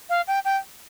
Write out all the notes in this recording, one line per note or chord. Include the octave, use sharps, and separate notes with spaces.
F5
G5
G5